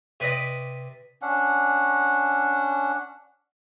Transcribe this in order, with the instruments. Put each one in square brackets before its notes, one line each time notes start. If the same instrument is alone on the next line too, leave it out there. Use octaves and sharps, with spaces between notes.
[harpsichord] C3 B4 D5 D#5
[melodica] C#4 D4 F#5